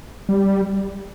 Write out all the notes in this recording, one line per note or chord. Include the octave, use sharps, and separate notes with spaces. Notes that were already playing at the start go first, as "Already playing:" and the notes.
G3